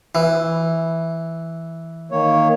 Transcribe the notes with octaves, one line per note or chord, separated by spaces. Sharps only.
E3
D#3 A#3 C#5